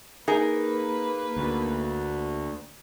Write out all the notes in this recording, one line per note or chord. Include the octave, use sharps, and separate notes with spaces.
A#3 D#4 G#4 A#4 B4
D2